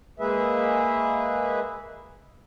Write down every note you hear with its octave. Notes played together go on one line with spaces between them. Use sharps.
G#3 A#3 G#4 B4 E5